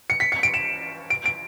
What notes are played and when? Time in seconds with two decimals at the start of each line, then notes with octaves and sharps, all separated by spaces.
0.10 C#7
0.20 B6
0.32 C#7
0.43 D7
0.54 E7
1.10 D7
1.26 D7